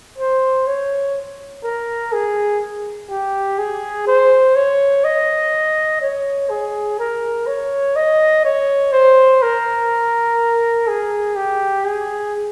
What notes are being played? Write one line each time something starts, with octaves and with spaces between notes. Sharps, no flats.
C5
C#5
A#4
G#4
G4
G#4
C5
C#5
D#5
C#5
G#4
A#4
C#5
D#5
C#5
C5
A#4
G#4
G4
G#4